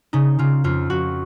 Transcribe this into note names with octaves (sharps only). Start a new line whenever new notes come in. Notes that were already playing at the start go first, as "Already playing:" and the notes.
C#3 D#4
C#3 F4
F2 F4
F2 F#4